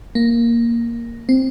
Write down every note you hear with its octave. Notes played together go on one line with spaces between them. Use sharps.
A#3
C4